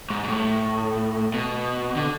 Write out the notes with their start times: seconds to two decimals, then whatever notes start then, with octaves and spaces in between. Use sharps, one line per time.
0.10 G#2
0.24 G#2
0.28 A2
1.34 B2
1.96 D3